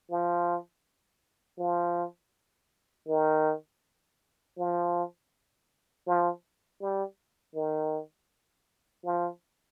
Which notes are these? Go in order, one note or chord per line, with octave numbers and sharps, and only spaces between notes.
F3
F3
D#3
F3
F3
G3
D#3
F3